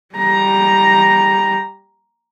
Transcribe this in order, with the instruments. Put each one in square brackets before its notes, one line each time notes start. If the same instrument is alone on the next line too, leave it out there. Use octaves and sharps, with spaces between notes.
[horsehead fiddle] G3 A#5